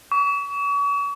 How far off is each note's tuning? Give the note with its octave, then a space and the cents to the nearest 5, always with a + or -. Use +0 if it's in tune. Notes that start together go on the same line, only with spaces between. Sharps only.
C#6 +40